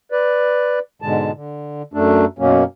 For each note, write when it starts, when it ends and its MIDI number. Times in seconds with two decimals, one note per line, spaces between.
0.12 0.79 71
0.12 0.79 74
1.02 1.31 44
1.02 1.31 47
1.02 1.31 50
1.02 1.31 56
1.02 1.31 81
1.34 1.82 50
1.93 2.25 42
1.93 2.25 57
1.93 2.25 62
2.39 2.64 42
2.39 2.64 47
2.39 2.64 54
2.39 2.64 58
2.39 2.64 61